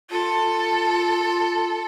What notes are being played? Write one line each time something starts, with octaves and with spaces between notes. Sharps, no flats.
F4 A4